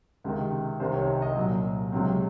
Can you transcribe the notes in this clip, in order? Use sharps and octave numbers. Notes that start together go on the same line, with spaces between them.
C#2 C3 D#3
C2 C3 D#3 C5
C#5
D#5
D#5
C2 A#2 F#3
C#2 C3 F#3 C4